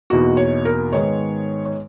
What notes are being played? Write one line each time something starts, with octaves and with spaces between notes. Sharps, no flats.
E2 B2 A#3 D#4 F#4
C#5
A#4
G#2 D#3 G#3 B3 C#5
C#5